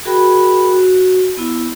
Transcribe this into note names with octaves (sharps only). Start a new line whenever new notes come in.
F#4 G#4 A#4 G5 B5
F#4
B3 E4